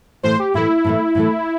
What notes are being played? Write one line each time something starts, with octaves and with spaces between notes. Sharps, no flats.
A2 E3 A3 C5
G4
A2 E3 A3 E4
A2 E3 A3
A2 E3 A3